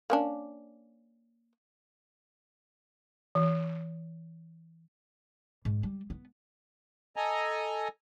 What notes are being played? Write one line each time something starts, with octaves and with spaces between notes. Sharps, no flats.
A#3 C#4 D4
E3
G#2
G3
B3
A4 D#5 G#5 A#5